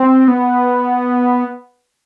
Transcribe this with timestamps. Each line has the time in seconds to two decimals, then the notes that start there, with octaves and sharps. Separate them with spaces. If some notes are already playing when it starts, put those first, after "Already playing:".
Already playing: C4
0.28 B3